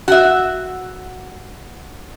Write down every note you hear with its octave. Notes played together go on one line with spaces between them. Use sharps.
F#4 E5